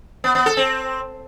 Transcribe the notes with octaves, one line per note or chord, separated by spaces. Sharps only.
B3
B3
A4
C4